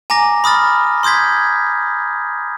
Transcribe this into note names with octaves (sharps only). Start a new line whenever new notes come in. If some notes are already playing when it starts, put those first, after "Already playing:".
G#5 A#5 D6 A#6
B5 D#6 F6 A6
C6 D#6 G6 G#6 B6